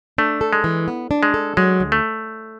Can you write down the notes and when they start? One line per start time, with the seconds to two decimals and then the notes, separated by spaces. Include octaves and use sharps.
0.18 A3 D4
0.41 A4
0.53 G#3
0.64 E3
0.88 B3
1.11 D4
1.23 G#3
1.34 A4
1.57 F#3 G#3
1.80 D2
1.92 A3